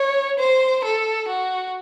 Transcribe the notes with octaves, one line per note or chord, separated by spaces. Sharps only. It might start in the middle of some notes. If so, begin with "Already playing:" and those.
Already playing: C#5
C5
A4
F#4